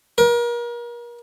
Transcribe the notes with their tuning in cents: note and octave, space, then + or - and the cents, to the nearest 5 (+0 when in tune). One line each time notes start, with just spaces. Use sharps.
A#4 +35